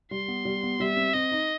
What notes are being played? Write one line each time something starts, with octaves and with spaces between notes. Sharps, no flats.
G3 C6
B3
G3
B3
G3 E5
C4
C4 D#5
D#4